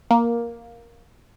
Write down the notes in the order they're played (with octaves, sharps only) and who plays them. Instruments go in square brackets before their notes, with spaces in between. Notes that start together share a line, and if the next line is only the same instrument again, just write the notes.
[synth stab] A#3